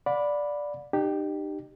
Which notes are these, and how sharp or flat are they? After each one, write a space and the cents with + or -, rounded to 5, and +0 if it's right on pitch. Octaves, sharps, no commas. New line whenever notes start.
D5 +0 F#5 -40 B5 +0
D#4 -40 G4 +0